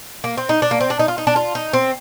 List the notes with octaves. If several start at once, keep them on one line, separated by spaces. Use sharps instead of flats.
A#3
C4
D#4
D4
A#3
C4
D4
D#4
F4
D#4
D4
F4
D#4
C4